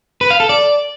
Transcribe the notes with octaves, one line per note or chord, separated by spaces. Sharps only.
B4
F5
A4
D5